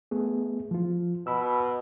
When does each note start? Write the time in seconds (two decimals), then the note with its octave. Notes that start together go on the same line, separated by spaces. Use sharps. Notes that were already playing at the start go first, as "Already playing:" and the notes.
0.11 A3 B3 G#4
0.71 F3 F4
1.27 B2 B5 E6